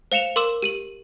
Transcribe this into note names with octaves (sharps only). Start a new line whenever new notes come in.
C5 F5 C#7 E7 F7
A#4 C6 D6 E6 E7
G4 D#7 F#7